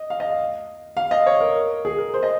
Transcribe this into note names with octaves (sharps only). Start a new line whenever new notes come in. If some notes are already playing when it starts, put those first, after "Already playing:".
Already playing: D#5
F5
D#5
F5
D#5
C#5
A#4
G#4
A#4
C5
D#5